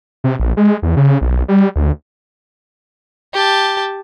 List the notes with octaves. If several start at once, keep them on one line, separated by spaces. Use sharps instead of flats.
C3
A#1
G#3
E2
C#3
B1
G3
D2
G4 A5